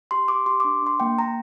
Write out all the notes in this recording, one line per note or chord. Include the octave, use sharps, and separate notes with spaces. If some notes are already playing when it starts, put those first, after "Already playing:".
G4 C6
G4 D6
G4 C6
D4 D6
D4 C6
A#3 G5
A#3 A#5